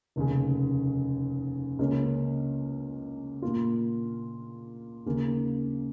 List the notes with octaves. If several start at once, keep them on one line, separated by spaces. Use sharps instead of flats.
F1 D#2 C#3
C#2 C#3 A#3 C#4
A#2 A#3 F4
D#2 C#3 A#3